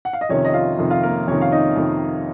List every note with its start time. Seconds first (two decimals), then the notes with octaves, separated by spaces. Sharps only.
0.05 F#5
0.13 F5
0.21 D#5
0.29 F2 C3 D#3 C#4 C#5
0.45 D#5
0.54 F4 F5
0.78 F2 C3 D#3
0.90 F4 F5
1.03 A#3 A#4
1.27 F2 C3 D#3 C#4 C#5
1.42 F5
1.52 D#4 D#5
1.76 F2 C3 D#3